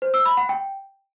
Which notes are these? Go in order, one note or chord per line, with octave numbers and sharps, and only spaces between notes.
C5
E6
B5
F#5
G5